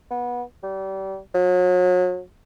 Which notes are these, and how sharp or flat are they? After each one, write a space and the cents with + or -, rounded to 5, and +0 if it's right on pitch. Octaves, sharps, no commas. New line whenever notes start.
B3 -20
G3 -30
F#3 -35